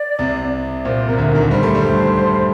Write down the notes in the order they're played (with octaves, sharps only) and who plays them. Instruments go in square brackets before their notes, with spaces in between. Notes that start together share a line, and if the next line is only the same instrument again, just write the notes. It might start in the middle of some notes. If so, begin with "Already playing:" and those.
Already playing: [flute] D5
[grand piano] C2 C3
[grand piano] A#2 [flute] C5
[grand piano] C3 [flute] A#4
[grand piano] D2 D3
[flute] A#4
[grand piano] D#2 D#3
[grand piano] G3 [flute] C5
[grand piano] A3
G2 G3